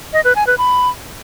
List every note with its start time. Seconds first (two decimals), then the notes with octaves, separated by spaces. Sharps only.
0.13 D#5
0.24 B4
0.36 G#5
0.47 B4
0.58 B5